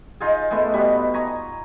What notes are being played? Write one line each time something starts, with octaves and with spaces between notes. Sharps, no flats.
D#4 F4 G#4
G#3 A3 B3
B2 G3 B4
G#5 A#5 C#6